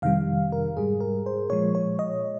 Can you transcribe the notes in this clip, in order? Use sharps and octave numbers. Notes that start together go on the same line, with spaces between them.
F2 C3 D#3 G3 F5
A#4
G#2 G3 G#4
A#4
C5
A#2 F3 G#3 C#5
C#5
D#5